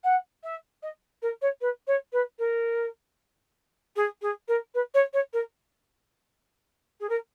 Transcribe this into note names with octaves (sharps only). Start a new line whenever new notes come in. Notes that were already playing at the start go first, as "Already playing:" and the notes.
F#5
E5
D#5
A#4
C#5
B4
C#5
B4
A#4
G#4
G#4
A#4
B4
C#5
C#5
A#4
G#4
A#4